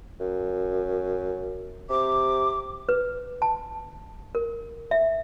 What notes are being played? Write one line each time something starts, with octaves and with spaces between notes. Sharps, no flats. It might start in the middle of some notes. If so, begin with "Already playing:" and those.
F#2
C3 D6
B4
A5
A#4
E5